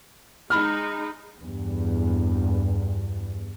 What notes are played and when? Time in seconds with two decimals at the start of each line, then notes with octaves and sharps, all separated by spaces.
0.50 G#3 D#4 B5 F6
1.39 E2 G2